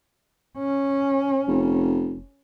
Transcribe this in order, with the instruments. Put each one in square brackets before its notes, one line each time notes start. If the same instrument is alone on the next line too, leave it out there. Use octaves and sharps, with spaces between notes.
[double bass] C#4
[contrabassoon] F1